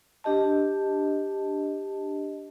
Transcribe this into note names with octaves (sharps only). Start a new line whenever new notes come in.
D4 G4 D#5 A5